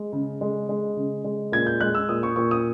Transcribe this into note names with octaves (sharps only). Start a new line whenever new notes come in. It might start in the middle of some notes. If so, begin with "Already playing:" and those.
Already playing: G#3
C#3
G#3
G#3
C#3
G#3
A#2 G#6
G6
G#3 F#6
E6
A#2 D#6
C#6
A#2 C#6
D#6